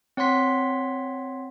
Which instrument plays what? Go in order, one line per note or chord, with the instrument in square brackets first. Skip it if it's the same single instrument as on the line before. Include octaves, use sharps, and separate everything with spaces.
[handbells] C4 C#5 F#5 C6 B6